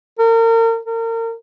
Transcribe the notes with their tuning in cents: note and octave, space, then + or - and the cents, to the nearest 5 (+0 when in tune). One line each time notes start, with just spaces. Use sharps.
A#4 -35
A#4 -35